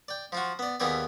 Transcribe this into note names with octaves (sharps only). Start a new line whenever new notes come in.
D5 G5
F3 F4 F#4
B3 D5
D#2 E3 B3 G4 G#4 D5